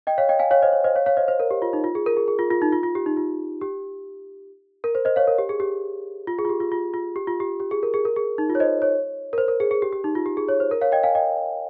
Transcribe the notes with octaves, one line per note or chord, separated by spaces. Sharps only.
D#5 G5
C#5 F5
D#5 G5
F5 G#5
C#5 F5
C5 D#5
C#5
C5 D#5
C#5 F5
C#5 F5
C5 D#5
C5
A#4
G4
F4
D#4
F4
G#4
A#4
G#4
G#4
F4
F4
D#4
F4
F4
G4
D#4
F4
G4
A#4
C5
C5 D#5
C#5 F5
A#4
G4
G#4
G4
F4
G#4
F4
G4
F4
F4
F4
G4
F4
G4
G4
G#4
A#4
G#4
A#4
G#4
D#4
F4
C#5
C5 D#5
C#5
A#4
C5
A#4
G#4
G#4
G4
G4
D#4
F4
G4
G#4
C#5
C5
A#4
C#5 F5
D#5 G5
F5 G#5
D#5 G5